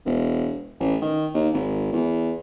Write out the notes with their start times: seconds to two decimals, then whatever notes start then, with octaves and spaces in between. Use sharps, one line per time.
0.06 E1
0.80 A1
1.02 D#3
1.34 D#2
1.54 G#1
1.92 E2